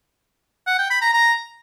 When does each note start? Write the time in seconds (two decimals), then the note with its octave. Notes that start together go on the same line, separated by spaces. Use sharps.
0.67 F#5
0.79 G5
0.90 B5
1.02 A#5
1.14 A#5